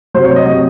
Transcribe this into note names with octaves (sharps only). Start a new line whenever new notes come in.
C3 F#3 C5
C#5
D#5
C3 F#3 D#5